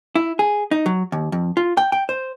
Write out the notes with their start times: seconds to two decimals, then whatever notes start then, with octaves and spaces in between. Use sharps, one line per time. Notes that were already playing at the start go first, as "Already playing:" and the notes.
0.15 E4
0.39 G#4
0.71 D#4
0.86 F#3
1.12 D#2
1.32 F2
1.57 F4
1.77 G5
1.92 G5
2.09 C5